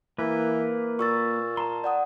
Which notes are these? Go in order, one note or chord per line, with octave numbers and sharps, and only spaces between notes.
E3 A#3 B4
A#2 C#6 E6 A6
A5 A#5 C6
D5 F#5 D#6